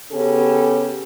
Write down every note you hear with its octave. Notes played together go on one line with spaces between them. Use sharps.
C#3 B3 C#4 G4 A4